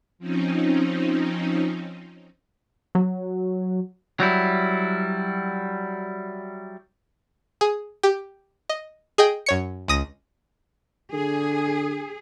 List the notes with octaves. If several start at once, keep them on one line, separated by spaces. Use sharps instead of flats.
F3 C4 C#4 D#4
F#3
F#3 G3 E4
G#4
G4
D#5
G#4 D#5 G5
F#2 C#5 C#7
C#2 D#6 A#6
D3 G#4